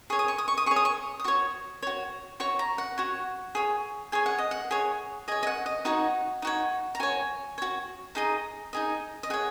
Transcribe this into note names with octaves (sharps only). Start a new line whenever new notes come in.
G#4 C#5 C#6
D#6
C#6
D#6
C#6
D#6
G#4 C#5 C#6
D#6
C#6
D#6
F#4 C#5 C#6
F#4 C#5
F#4 C#5 C#6
A#5
F#5
F#4 C#5
G#4 C#5
G#4 C#5 G#5
F#5
D#5
F#5
G#4 C#5
G#4 C#5 D#5
D#5
F#5
D#5
D#4 F#4 C#5 F#5
D#4 F#4 C#5
A#5
F#4 C#5 G#5
F#4 C#5
D#4 G#4 D#5 A#5
D#4 G#4 D#5
D#5
G#4 C#5 F#5